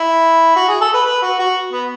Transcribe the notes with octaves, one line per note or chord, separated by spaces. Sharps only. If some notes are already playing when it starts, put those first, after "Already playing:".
Already playing: E4
F#4
G#4
A4
B4
B4
F#4
F#4
B3